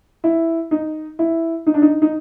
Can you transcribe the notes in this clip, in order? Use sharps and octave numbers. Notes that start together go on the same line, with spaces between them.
E4
D#4
E4
D#4
D4
D#4
D#4